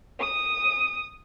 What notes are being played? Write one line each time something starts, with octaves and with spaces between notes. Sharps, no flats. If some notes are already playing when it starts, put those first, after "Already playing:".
D#6